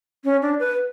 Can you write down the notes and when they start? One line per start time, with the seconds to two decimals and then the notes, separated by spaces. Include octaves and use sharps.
0.25 C#4
0.42 D4
0.60 B4